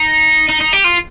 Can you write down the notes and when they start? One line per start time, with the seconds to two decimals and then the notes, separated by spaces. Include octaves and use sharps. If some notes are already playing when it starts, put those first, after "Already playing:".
Already playing: D#4
0.49 D#4
0.61 D#4
0.73 G4
0.84 F4